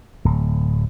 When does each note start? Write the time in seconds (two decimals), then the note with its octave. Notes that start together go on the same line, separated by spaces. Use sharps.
0.25 D1